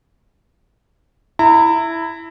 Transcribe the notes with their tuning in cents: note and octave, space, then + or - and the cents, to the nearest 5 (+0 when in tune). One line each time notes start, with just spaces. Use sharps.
E4 +0 A#5 -30